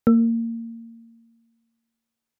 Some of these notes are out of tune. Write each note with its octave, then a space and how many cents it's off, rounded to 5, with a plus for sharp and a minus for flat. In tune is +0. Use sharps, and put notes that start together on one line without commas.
A#3 -25